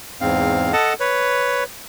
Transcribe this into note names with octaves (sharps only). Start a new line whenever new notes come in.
E2 G#2 C4 F5
A4 D#5 F#5 A5
B4 C#5